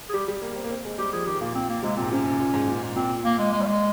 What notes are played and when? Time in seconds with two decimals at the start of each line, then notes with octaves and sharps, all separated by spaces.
0.09 G#4
0.14 G3 G4
0.28 G3
0.42 A#3
0.56 C4
0.64 A#3
0.71 C4
0.85 G#3
0.98 G3 G4
1.13 F3 G#4
1.26 D#3 G4
1.41 A#2 A#3
1.55 C4
1.69 A#3
1.83 C3 G#3
1.96 A#2 C4
2.02 G#2
2.11 C3 C#4
2.26 G#2
2.40 A#2
2.54 G#2
2.68 A#2
2.82 A#2
2.96 A#2 C4
3.24 A#3
3.39 G#3
3.53 G#3
3.62 G3
3.67 G#3